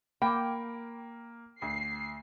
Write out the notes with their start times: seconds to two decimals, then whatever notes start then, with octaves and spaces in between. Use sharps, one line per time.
0.22 A#3 G5 B5 D6
1.62 D2 C7